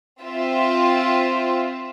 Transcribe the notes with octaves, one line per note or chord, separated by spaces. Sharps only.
C4 F4 E5